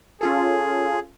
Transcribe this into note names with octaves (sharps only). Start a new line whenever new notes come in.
C#4 F4 G#4 A4